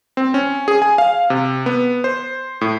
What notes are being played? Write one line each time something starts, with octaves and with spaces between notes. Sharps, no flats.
C4
C#4
G#4
G#5
F5
C3
B3
C5
A2